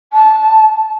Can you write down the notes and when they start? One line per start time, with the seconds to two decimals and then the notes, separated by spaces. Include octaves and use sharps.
0.13 A5